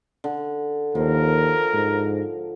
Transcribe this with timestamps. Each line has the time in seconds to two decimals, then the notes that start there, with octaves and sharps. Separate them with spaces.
0.24 D3
0.95 D#2 F3 A#4
1.74 G#2